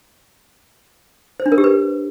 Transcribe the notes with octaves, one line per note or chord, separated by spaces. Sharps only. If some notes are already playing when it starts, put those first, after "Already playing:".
C5
D4
A#4
G4
B4